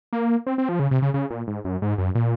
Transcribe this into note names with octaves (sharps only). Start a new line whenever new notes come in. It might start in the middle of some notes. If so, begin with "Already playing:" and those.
A#3
C4
C4
F3
C#3
C3
C#3
C#3
A#2
G#2
F#2
G#2
F#2
A#2